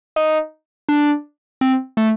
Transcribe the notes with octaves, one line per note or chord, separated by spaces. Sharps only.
D#4
D4
C4
A3